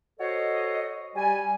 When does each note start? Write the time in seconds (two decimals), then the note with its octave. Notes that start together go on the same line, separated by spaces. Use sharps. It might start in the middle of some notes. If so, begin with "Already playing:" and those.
0.19 F#4 A4 C5 C#5 D#5
1.16 G3 G#5